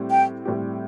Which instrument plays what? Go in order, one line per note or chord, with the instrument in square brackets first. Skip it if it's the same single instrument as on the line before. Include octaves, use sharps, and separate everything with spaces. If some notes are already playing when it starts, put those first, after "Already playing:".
Already playing: [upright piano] A2 G3 C4 G4
[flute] G5
[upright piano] A2 G3 C4 G4